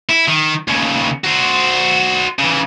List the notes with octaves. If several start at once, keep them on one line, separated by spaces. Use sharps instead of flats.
E4
D#3
D#2 C#3
F#4 C5
C#3 E3